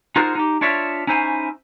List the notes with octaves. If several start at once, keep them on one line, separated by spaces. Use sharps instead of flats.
D#4 F4 F#4 G#4 A#4 C5
D#4 G4
D4 F4 C#5 D5 E5
C#4 D#4 E4 C5 G#5